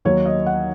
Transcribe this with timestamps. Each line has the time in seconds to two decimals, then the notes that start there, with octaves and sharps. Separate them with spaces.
0.05 D#2 D#3 F#3 C#5
0.26 D#5
0.46 F#5